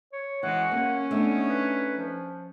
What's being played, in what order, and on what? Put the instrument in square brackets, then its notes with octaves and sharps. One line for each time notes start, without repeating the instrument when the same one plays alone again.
[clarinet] C#5
[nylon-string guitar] E3 [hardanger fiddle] G#3 F#4 [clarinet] F#5
[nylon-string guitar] A#3 [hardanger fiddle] C#4
[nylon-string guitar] A3 D4 D#4 [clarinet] B3
[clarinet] B4
F3